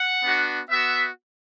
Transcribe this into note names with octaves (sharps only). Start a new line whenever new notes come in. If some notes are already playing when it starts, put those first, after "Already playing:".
Already playing: F#5
B3 D4 F#4
B3 F#4 E5